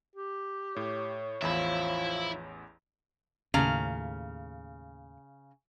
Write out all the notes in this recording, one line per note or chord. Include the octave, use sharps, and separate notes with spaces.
G4
A2 C#5
A1 E2 F3 E4 E5 B5
D#2 A2 C#3 F5 A#5